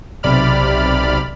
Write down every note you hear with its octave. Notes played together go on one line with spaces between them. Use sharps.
B1 C3 D5 B5 F6